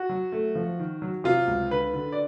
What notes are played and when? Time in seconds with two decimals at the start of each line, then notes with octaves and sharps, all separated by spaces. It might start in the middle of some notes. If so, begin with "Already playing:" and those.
Already playing: F#4
0.09 F#3
0.32 A3
0.55 F3
0.79 D#3
1.02 F#3
1.24 C3 F4
1.47 C#2
1.71 D3 B4
1.94 D3
2.12 D5